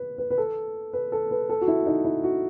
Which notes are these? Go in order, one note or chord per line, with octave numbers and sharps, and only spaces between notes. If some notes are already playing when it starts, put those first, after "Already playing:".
Already playing: B4
B4
B4
A4
B4
A4
B4
A4
F#4
E4
D#4
E4
F#4